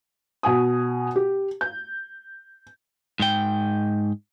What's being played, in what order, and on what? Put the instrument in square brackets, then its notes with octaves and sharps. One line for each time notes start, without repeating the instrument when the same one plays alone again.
[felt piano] B2 G#5 D#6
G4
G6
[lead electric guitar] G#2 G5